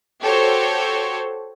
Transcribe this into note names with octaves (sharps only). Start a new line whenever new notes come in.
F#4 G4 A4 C5 C#5